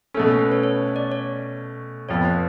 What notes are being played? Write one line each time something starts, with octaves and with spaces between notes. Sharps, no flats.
B2 A3 C#4 A4
A4
B4
C#5
C#5
D5
C#5
F2 F3 B3 C#5
B4